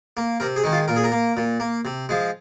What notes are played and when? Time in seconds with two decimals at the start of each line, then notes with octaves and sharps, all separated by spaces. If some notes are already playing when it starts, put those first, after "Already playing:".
0.17 A#3
0.40 C3 A#4
0.56 G#4
0.64 D#3 G#3
0.72 F4
0.88 A#2 A#4
0.96 G#4
1.04 A#4
1.12 A#3
1.37 A#2
1.60 A#3
1.85 C3
2.09 F3 G#3